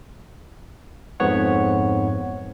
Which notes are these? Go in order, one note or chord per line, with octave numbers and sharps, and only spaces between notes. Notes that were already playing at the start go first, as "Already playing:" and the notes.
F2 G#2 B3 C#5 F#5